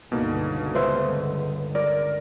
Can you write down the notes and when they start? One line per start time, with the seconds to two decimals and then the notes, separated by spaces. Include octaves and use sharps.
0.12 C#2 G2 B2 D3 A#3 D#4
0.75 B4 C5 E5
1.75 A#4 D5